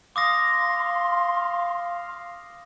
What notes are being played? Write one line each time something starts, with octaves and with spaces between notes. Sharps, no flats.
F5 C6 D6 D#6 A#6